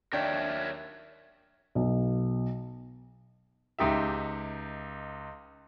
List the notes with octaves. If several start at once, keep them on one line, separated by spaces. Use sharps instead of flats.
D#2 D4 A#4 C#5 E5 G5
B1
C#2 D#4 G4 E5